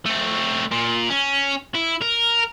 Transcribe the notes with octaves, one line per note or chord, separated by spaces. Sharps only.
A3 C4
A#2
C#4
E4
A#4